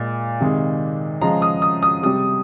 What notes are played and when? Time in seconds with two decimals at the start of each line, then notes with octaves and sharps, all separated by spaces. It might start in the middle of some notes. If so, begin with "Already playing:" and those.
Already playing: A#2 G#3
0.40 C3 D#3 G#3
1.21 C#3 F3 G#3 A#5
1.42 D#6
1.62 D#6
1.83 D#6
2.03 C3 G3 D#6